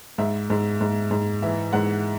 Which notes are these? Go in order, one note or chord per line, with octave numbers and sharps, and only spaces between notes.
G#2 E5
G#2
G#2
G#2
E3 E5
G#2 F#5